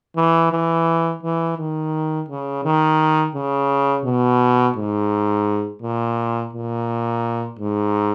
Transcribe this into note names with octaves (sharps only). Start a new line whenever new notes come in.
E3
E3
E3
D#3
C#3
D#3
C#3
B2
G#2
A#2
A#2
G#2